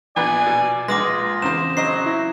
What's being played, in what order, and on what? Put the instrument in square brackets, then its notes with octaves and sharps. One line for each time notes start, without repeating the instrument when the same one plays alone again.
[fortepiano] A#1 B3 B4 [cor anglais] D5 [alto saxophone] G#5
[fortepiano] B2
[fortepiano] A#1 G#3 [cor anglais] F4 [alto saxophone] B4 [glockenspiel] D6 D#6 A#6
[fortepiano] E2 C#3 C5 [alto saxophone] C4 [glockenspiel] E7
[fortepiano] C#3 C5 D#5 [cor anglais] F#3 [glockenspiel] C7
[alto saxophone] E4